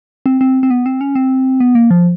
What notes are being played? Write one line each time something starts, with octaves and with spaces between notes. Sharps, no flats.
C4
C4
C4
B3
C4
C#4
C4
B3
A#3
F3